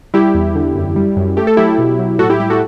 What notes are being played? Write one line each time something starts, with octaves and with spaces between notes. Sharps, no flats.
G3 E4 G4
E2
D3
F#2
G3
F#2
A3 G4
A4
F#3 E4 G4
B2
F#3
A2 F#4 A4
E4 G4
G3 E4 G4
F#4 A4